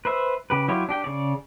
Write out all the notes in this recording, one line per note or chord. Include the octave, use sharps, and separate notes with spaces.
B4 C5 E5
C#3 G4 B4
F#3 E4 F4 G4 C#5
D4 G4 G5
C#3 C#5 D5